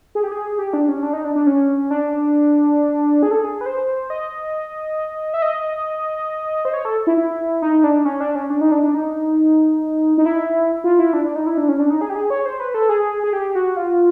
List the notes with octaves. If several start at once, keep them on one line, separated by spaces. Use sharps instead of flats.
G#4
G4
G#4
G4
D4
C#4
D4
D#4
D4
D4
C#4
D4
G#4
A4
G#4
B4
C5
D#5
E5
D#5
C5
C#5
A4
E4
E4
D#4
D4
C#4
D4
C#4
D4
D#4
D4
D4
D#4
D#4
E4
F4
E4
D4
D4
D#4
E4
D4
C#4
D4
D#4
G#4
G4
G#4
C#5
C5
B4
A4
G#4
G#4
G4
F#4
F4